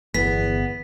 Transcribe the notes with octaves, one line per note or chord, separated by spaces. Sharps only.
G1 E2 B3 B6